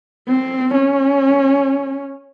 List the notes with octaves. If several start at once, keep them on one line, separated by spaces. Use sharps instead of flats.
C4
C#4